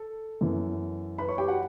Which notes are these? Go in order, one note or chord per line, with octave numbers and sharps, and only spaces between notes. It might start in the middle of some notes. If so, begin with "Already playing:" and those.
Already playing: A4
F#2 E3 B3
B4 B5
C#5 C#6
G4 G5
F#4 F#5